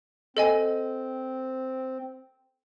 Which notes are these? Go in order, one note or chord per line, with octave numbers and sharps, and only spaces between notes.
C4 A4 D#5 G#5